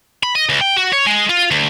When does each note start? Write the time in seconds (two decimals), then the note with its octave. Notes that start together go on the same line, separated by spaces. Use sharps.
0.23 B5
0.35 D#5
0.49 C#2
0.61 G5
0.76 F#4
0.93 C#5
1.06 G#3
1.29 F4
1.51 D2